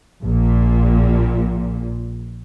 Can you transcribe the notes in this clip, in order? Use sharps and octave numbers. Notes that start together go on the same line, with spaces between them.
A#1 A#2